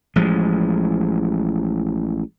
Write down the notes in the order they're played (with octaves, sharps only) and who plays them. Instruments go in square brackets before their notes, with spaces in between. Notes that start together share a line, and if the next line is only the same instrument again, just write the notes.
[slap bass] A1 F3 G#3